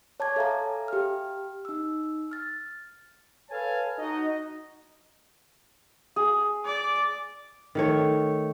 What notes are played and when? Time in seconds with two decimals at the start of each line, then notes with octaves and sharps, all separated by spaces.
0.20 C#5 A5 D6 G#6
0.36 A4 E5 F5 G#5 A#5
0.88 G4 F6
1.65 D#4 E6
2.31 F6 A6
3.50 A4 B4 C#5 F5 G#5 A5
3.99 D#4 F#4 D#5
6.16 G#4
6.65 D5
7.75 D#3 A3 C#5